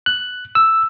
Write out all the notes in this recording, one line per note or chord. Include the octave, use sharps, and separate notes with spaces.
F#6
E6